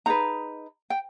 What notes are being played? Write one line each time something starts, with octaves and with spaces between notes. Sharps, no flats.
D#4 G#4 B4 A#5
G5